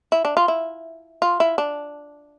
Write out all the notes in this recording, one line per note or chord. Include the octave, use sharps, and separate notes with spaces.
E4
D4
F4
E4
F4
E4
D4